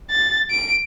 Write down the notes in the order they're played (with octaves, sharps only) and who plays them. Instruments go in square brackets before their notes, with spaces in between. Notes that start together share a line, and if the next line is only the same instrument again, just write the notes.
[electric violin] A6
D7